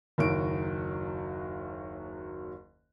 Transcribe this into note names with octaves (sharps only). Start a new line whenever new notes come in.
F#1 D#2 F#3 F#4 D7